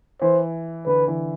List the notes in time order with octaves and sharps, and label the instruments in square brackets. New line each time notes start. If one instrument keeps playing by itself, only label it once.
[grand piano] E3 [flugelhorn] C5
[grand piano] D3 [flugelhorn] B4
[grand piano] E3